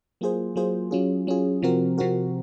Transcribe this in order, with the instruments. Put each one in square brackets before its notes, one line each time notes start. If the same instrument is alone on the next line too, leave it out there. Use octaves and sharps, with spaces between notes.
[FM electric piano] F#3 A#3 F4 G#4 C5
F#3 A#3 F4 G#4 C5
F#3 C#4 F4 G#4
F#3 C#4 F4 G#4
C3 F3 C4 F#4 A#4
C3 F3 C4 F#4 A#4